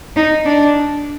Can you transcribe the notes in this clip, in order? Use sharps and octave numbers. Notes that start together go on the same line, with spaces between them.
D#4
D4